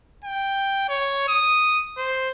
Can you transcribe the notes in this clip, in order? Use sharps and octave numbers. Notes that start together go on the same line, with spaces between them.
G5
C#5
D#6
C5